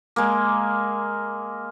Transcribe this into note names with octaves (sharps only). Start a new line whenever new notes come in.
G#3 A#3